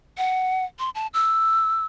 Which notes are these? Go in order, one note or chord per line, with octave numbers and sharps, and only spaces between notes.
F#5
C6
A5
E6